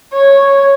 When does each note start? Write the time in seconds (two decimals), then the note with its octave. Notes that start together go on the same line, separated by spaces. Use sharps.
0.13 C#5